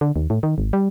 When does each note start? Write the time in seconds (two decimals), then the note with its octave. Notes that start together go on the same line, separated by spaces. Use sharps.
0.01 D3
0.16 D#2
0.30 A2
0.43 D#3
0.58 G#1
0.73 G3